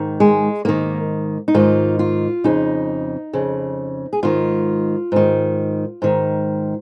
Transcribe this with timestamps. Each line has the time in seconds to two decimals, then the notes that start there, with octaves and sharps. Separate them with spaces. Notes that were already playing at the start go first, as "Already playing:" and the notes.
Already playing: G#2 D#3
0.20 G#3
0.65 G#2 D#3 A#3
1.48 D#4
1.54 G#2 D#3 F4
1.99 F4
2.44 F2 C#3 D#4
3.33 F2 C#3
4.13 G#4
4.23 G#2 D#3 F4
5.12 G#2 D#3
6.02 G#2 D#3